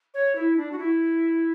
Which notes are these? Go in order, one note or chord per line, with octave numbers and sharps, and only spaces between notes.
C#5
E4
D4
F#4
E4